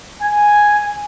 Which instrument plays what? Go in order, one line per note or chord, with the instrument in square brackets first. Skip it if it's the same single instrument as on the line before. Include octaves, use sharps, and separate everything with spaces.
[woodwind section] G#5